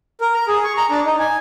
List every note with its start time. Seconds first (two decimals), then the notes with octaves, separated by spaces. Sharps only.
0.21 A#4
0.34 A#5
0.48 G#4
0.64 C#6
0.77 A#5
0.90 D4
1.05 D#4
1.19 G#5